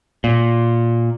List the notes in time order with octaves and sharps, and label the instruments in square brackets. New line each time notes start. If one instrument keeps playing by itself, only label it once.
[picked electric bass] A#2